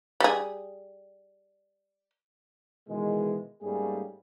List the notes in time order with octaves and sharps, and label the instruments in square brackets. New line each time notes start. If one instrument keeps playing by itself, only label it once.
[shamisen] G3 G#4
[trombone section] B2 D#3 E3 G#3
G#2 G3 A3 A#3 C#4 G#4